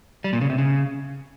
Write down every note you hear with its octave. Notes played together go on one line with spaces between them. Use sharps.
G3
A#2
C#3
C3
C#3